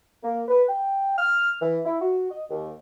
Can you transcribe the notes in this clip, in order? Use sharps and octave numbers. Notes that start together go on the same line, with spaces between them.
A#3
B4
G5
F6
E3
E4
F#4
D#5
D#2